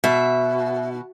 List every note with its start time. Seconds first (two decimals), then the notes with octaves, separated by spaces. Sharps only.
0.04 B2 E5